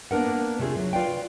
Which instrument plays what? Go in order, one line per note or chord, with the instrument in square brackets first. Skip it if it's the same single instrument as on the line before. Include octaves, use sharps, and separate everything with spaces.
[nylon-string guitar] A#3 B3 D4 A#4 F#5
C3 A3 F4 G#4
F#3
F4 B4 D5 F5 G5